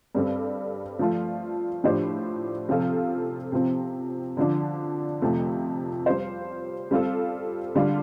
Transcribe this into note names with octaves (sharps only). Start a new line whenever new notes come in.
G2 G3 C4 A4
F3 A3 F4
A2 F3 D4 G4 C5
C3 F3 C4 F4 A4
C3 F3 C4
D3 F3 D4
F2 C3 F3 A3
G3 F4 C5
G3 C4 F4 A4
D3 G3 D4 F4